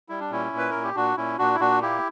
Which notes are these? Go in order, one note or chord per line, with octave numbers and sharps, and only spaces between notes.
G3 E4
D4
A#2 C#4 E4
A#2
B4
A#2 A#4
G4
A#2 D4 F#4
A#2 C#4 E4
A#2 D4 F#4
E4
A#2 D4 F#4
A#3 E4 G4